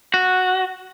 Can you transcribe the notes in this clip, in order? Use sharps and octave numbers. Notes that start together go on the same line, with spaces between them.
F#4